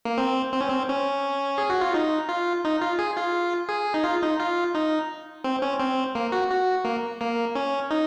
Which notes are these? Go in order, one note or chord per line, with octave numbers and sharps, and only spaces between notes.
A#3
C4
C4
C#4
C4
C#4
G#4
F#4
F4
D#4
F4
D#4
F4
G#4
F4
G#4
D#4
F4
D#4
F4
D#4
C4
C#4
C4
A#3
F#4
F#4
A#3
A#3
C#4
D#4